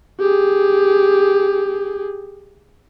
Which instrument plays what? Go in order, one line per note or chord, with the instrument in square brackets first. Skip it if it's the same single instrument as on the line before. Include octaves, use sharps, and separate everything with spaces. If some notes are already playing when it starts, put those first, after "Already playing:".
[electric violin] G4 G#4